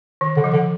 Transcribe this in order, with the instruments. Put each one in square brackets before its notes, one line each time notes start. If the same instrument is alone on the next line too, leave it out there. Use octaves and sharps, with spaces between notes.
[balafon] D#3
[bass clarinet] D3
[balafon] F3
[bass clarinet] D3